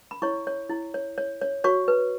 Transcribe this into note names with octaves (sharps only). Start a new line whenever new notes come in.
B5
E4 C#5 C#6
C#5
E4
C#5
C#5
C#5
F#4 C#5 C#6
B4